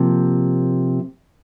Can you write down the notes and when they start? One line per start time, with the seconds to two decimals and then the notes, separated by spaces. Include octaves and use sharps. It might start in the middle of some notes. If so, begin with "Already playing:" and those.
Already playing: C3 F3 A#3